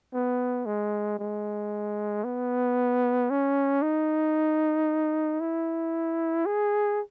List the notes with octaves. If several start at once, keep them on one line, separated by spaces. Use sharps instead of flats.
B3
G#3
G#3
B3
C#4
D#4
E4
G#4